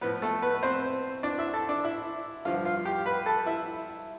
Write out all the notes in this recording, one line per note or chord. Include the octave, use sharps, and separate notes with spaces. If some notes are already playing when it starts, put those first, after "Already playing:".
A2 F3 B3 B4
A3 A4
B3 B4
C4 C5
D4 D5
E4 E5
A4 A5
D4 D5
E4 E5
G2 D3 F3 F4 F5
F4 F5
G4 G5
B4 B5
A4 A5
E4 E5